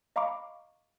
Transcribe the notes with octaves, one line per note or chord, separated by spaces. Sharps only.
D#5 F5 A#5 B5 C#6 D6